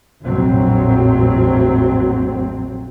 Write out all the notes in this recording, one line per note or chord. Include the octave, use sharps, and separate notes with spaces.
A#1 F2 A2 F#3 C4